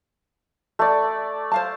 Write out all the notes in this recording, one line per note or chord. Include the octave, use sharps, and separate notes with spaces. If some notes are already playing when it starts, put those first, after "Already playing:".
A3 D5
C5 F5 A5